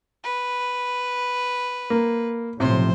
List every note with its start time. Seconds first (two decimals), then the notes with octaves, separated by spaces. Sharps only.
0.24 B4
1.90 A#3
2.60 B1 A2 C3 F3 C5